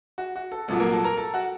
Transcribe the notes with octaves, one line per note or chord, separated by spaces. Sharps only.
F#4
F#4
A4
C2 A#2 F#3 A4
A#3 A#4
A4 A5
A#4 A#5
A4 A5
F#4 F#5